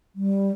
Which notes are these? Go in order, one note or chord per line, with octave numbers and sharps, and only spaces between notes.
G3